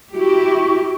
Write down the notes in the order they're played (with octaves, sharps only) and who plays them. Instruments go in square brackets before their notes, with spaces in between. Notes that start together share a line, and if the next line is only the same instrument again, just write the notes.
[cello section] E4 G4 [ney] F#4